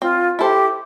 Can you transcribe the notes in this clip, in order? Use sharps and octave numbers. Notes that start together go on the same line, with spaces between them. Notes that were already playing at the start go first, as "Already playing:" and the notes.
C4 F4
E4 G4 A4 C5